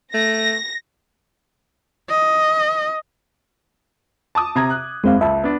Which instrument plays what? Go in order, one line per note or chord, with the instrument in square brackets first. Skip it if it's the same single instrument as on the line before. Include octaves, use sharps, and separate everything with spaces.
[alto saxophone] A3 [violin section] A#6
[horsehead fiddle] D#5
[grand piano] A5 D6 D#6
C3 A#5 G#6
F#6
[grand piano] F#1 [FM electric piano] G#3 C4 F5
[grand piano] C#2 [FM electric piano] E5 A5
[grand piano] B3 D4